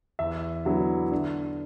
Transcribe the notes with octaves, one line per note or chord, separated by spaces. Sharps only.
E2 E5
D3 F#3 B3 E4
D3